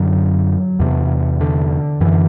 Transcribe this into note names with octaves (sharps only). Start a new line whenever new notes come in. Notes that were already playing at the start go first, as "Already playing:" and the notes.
Already playing: F#2 D3 F#3
E2 C3
D3
F#2 D3 E3